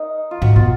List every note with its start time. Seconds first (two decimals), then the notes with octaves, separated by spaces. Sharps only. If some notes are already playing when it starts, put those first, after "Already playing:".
Already playing: D#4 A#4
0.31 F4
0.41 G#2 F#4
0.56 B2 F4